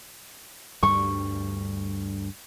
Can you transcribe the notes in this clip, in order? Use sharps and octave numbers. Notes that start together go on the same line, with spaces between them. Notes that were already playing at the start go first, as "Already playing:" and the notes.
D2 G2 G3 C#6